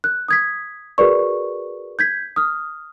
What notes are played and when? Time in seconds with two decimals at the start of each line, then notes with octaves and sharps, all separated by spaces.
0.04 F#6
0.28 D#6 G#6 B6
0.98 F#4 G#4 A#4 B4 D5 C#6
1.99 G6 G#6 B6
2.36 D#6 F6